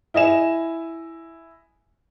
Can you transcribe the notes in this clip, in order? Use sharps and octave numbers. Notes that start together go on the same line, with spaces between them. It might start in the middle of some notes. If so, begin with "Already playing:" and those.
E4 D#5 G#5 E7